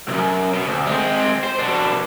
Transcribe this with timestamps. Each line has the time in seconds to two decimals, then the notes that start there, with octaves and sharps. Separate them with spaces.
0.08 C2 F#2
0.54 B2
0.66 D2
0.87 G#3 C4
1.44 C5
1.59 B2 D4